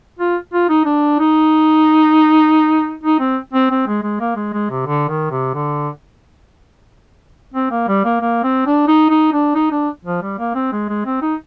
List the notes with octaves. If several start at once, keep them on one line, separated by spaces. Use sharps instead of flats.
F4
F4
D#4
D4
D#4
D#4
C4
C4
C4
G#3
G#3
A#3
G#3
G#3
C3
D3
D#3
C3
D3
C4
A#3
G3
A#3
A#3
C4
D4
D#4
D#4
D4
D#4
D4
F3
G3
A#3
C4
G#3
G#3
C4
D#4